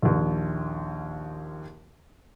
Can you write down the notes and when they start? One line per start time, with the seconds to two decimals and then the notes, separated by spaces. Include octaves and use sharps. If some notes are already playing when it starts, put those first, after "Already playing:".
0.02 A#1 D#2